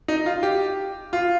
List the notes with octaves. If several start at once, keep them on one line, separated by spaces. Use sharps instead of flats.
D#4
F4
G4
F4